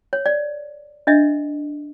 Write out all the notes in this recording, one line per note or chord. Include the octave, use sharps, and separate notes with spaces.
C#5
D5
D4 D#5 E5